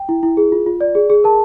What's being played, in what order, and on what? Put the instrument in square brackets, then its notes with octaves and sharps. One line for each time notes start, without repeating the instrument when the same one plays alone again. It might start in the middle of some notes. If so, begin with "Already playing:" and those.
Already playing: [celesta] G5
E4
E4
G#4
F4
F4
D5
G#4
G#4
A#4 A5